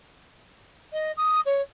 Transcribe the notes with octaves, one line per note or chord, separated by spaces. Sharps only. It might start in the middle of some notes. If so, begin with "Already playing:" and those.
D#5
D#6
C#5